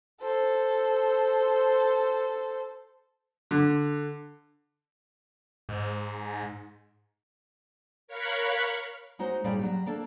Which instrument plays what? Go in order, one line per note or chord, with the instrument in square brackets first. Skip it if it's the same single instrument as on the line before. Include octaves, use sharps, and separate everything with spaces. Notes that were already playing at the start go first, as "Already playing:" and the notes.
[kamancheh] A4 C5
[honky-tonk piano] D3
[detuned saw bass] G#2
[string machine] A#4 C#5 F5 B5 C#6 F#6
[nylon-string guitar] G#3 D#4 F#4 C5 C#5
A#2 G3 C#4 G#4 D5
F#3 D4 G4
A#3 D4 A4